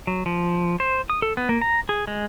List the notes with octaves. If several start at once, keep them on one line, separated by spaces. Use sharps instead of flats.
F#3
F3
C5
D#6
A4
B3
A#3
A#5
G#4
G#3